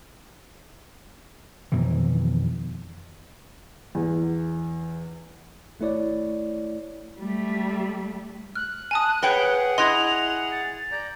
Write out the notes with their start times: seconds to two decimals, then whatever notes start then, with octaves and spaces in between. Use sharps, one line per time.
1.72 F2 B2 D#3 E3
3.95 E2
5.80 G#1 A3 E4 C#5 D5
7.19 G3 A3
8.55 F6 F#6
8.91 G#5 A5 D#6
9.23 G#4 B4 C#5 F#5 G5 G7
9.78 E4 D#5 C6 F#6 A#6 F7
10.51 A6
10.92 D5 A#5 G6